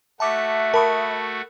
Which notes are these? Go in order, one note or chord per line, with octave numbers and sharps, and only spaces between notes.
A3 F#4 E5 A5 D6 F#6
A#4 A5 B5 C#6 D#6